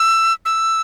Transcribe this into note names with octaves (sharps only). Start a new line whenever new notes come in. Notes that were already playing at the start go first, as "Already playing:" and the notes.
Already playing: E6
E6